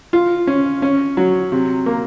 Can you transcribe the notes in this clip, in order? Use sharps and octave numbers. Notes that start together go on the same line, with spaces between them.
F4
C#4
C#4
F#3
C3
A#3